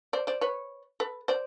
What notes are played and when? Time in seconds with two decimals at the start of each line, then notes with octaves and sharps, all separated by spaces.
0.13 C5 D5
0.27 C5 D5
0.41 B4 C#5
1.00 A4 B4
1.28 C5 D5